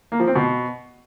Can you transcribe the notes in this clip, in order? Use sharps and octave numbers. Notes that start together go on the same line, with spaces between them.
A#3
F3
C4
B2